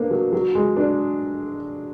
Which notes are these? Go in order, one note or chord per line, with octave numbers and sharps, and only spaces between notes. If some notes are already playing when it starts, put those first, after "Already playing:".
Already playing: A#3 B3 D4
F#3
F#3
G#3
D4